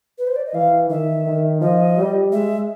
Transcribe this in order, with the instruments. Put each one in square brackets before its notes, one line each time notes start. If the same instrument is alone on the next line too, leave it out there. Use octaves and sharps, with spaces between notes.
[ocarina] B4
C5
D5
D#5
[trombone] E3 [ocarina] F5
[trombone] D#3 [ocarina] E5
[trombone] D#3
[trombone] F3 [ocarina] D#5
[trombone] G3
[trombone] G#3 [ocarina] E5